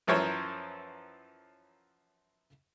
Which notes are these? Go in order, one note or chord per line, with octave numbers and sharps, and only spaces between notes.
F#2 E3 F3 A#4 C5 C#5